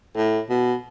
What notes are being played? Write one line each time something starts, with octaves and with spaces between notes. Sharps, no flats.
A2
B2